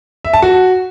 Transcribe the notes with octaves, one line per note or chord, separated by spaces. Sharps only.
E5
A5
F#4